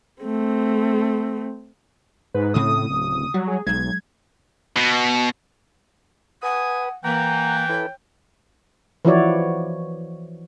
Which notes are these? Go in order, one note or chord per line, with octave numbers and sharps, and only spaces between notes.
A3 C4
G#2 B4
D2 A2 C#3 C4 D#6
D1
F#3 G3
G#4
B1 F#3 G#3 G#6
B2
B4 F#5 G#5 D#6
E3 A#3 F#5 G5 A#5
E4 A4 B4 C#5
E3 F3 E4 F#4 C#5 D5